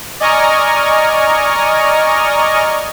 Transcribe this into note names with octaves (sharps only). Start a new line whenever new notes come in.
D5 D#5 G#5 A#5 C#6 F6